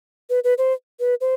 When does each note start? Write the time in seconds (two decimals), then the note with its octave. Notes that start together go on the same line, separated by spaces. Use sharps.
0.30 B4
0.44 B4
0.58 C5
1.00 B4
1.21 C5